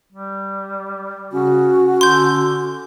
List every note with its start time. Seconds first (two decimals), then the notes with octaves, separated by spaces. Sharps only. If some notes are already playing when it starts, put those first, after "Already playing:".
0.13 G3
1.32 C#3 C#4 F#4
2.01 D3 C6 G6